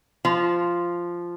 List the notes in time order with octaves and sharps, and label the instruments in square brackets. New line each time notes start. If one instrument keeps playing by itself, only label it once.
[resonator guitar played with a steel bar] F3